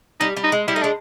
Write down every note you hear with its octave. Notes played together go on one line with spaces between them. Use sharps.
G3 D#4
G3
D#4
G#3
G3 E4
A3 D#4
G#3 D4